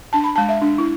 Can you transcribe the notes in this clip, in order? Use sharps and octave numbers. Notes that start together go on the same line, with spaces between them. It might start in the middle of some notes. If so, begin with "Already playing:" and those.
D4 A5
B5
G#3 A5
E5
D4
E4